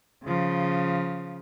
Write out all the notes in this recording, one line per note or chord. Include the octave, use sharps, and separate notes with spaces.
C#3 F3